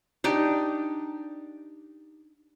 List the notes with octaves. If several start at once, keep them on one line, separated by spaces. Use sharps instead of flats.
D4 D#4 G4